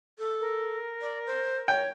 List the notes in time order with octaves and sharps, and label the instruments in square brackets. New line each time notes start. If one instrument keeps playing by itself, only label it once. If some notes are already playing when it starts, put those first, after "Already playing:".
[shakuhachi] A4
[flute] A#4
[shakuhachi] D5
C5
[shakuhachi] C#5 [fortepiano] G5